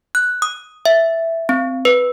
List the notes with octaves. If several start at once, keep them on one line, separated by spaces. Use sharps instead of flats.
F#6
D#6
E5
C4
B4